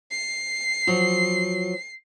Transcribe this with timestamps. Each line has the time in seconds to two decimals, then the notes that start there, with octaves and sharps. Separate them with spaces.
0.11 C7
0.87 F3 F#3